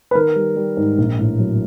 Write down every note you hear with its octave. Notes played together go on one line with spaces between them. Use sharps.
B4
D#3 A#4
G3
G3
G#2
A#1
A2
F#3